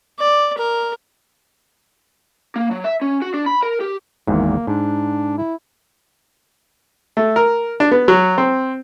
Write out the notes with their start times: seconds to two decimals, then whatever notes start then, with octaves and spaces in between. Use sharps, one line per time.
0.19 D5
0.58 A#4
2.56 A#3
2.71 F#3
2.84 E5
3.01 C#4
3.22 F#4
3.34 D4
3.46 B5
3.63 A#4
3.80 G4
4.27 G#1 E2 G#2 A#3
4.67 G#2 D4
5.38 E4
7.17 A3
7.36 A#4
7.80 D4
7.91 B3
8.08 F#3
8.38 C4